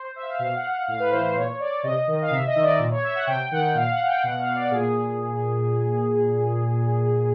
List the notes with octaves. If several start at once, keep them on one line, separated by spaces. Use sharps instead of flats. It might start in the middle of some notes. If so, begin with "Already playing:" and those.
Already playing: C5
E5
F5
E5
B2 F5
F#5
F#5
A2 F5
B4
E3 C5
A#2 C#5
D5
C3 D#5
D#3
F5
C3 E5
D#5
D#3
D5
A#2
C#5
E5
F#5
C3 G5
D#3 F#5
A#2 F5
F#5
G5
B2 F#5
F5
D5
A#2 G#4